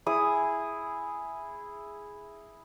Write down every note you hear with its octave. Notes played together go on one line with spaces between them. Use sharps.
E4 G#4 D#6